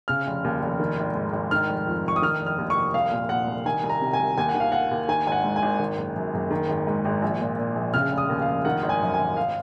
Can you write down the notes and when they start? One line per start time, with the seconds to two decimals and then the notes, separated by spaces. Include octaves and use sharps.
0.08 C#3 F6
0.27 F1
0.44 D#2
0.62 F1
0.80 D#3
0.98 G#1
1.15 G#2
1.33 G#1
1.51 D#3 F6
1.69 F1
1.87 F2
2.05 F1 C#6
2.16 D#6
2.22 D#3 F6
2.41 F1
2.46 F6
2.58 D#2
2.70 C#6
2.76 F1
2.94 C2 F5
3.11 A#2
3.29 A#2 F#5
3.47 C2
3.66 D#3 G#5
3.84 C2
3.90 A#5
4.01 C3
4.13 G#5
4.19 C2
4.38 D#2 G#5
4.49 F#5
4.54 D#3
4.60 F5
4.72 D#3 F#5
4.91 D#2
5.09 D#3 G#5
5.27 G#1 G#5
5.32 F#5
5.44 G#2
5.56 G#5
5.62 G#1
5.79 D#3
5.97 F#1
6.16 F#2
6.34 F#1
6.51 D#3
6.69 G#1
6.87 G#2
7.05 G#1
7.22 A#1
7.41 A#2
7.59 A#2
7.76 A#1
7.94 C#3 F6
8.11 F1
8.18 D#6
8.29 D#2
8.42 F5
8.47 F1
8.65 D#3 F#5
8.83 G#1
8.89 G#5
9.02 F#2
9.14 G#5
9.19 G#1
9.37 F5